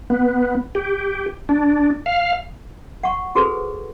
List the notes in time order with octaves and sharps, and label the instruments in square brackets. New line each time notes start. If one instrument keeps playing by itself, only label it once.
[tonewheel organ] B3
G4
D4
F5
[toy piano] F#5 C#6
F4 F#4 G#4 A4 B4 C5